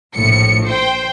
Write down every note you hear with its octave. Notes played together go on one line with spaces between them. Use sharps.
A#1 A2 C#7
C5 G5